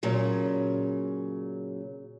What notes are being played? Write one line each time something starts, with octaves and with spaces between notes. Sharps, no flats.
A#2 C#3 F#3